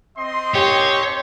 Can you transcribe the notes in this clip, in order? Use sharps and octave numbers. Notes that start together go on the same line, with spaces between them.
C4 D#5 C6
G4 C#5